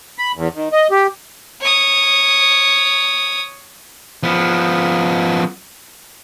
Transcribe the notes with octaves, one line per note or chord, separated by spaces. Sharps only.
B5
E2
D#3
D#5
G4
C#5 D#6
F3 B3